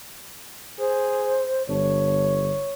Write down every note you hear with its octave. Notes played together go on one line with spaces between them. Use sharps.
G#4 C5
G1 D4 C#5